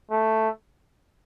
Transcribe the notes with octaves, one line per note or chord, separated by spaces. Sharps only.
A3